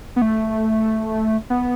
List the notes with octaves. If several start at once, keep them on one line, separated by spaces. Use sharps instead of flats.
B3
A3
B3